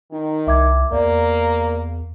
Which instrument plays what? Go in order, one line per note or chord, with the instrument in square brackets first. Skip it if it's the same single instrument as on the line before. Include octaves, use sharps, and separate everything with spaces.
[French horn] D#3 [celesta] D#4
[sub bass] C2 [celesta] E5 D6 G#6
[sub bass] E2 [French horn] A#3 [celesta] D5